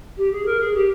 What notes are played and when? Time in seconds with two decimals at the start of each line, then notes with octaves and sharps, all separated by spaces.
0.17 G4
0.31 G#4
0.45 A#4
0.60 G#4
0.74 G4